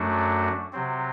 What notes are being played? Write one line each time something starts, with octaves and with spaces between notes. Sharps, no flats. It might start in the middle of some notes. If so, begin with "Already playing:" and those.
Already playing: F#2 F#3 A3 D4 F#4
C3 F#3 C4